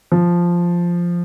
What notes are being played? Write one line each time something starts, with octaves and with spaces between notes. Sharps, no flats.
F3